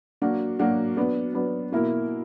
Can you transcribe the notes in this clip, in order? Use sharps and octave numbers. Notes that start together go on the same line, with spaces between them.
F#3 A#3 D4 F#4
F#3 A#3 D4 F#4
F#3 B3 D4
F#3 B3 D4
B2 A#3 E4 A#4